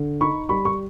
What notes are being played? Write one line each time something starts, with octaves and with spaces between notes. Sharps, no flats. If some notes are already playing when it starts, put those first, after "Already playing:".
Already playing: D3
D#4 B5 C#6
G3 B5 C#6
C#6